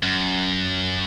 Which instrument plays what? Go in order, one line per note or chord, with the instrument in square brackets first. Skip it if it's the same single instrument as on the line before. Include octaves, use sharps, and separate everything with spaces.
[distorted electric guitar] F#2